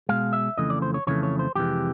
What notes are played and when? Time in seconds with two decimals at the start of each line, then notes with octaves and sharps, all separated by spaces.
0.09 B2 G#3 F5
0.33 E5
0.58 F2 C#3 E3 A3 D#5
0.70 D5
0.82 C5
0.94 C#5
1.07 F2 C#3 E3 A3 C#5
1.23 C#5
1.39 C5
1.56 F2 C3 E3 G#3 G4